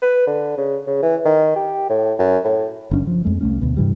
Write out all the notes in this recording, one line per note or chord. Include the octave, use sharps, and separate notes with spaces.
B4
D3
C#3
C#3
E3
D#3
G4
A2
F#2
A2
F#1 F#2 C#4 D4
F3
F2 G#3 A3
C2 A2 A3 C#4
D2 B2
G2 C3 E3 G3